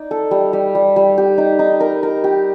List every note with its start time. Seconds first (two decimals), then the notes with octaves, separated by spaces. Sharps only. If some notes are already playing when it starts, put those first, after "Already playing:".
Already playing: D#4 D5
0.11 A4
0.31 G3
0.53 G3
0.75 G3
0.96 G3
1.18 G4
1.38 D#4
1.59 D#4
1.80 A#4
2.03 A#4
2.24 G4